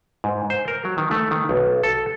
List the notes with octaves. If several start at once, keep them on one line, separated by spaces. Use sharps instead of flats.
G#2
C5
A#4
F#3
D#3
A3
D#3
B1
A4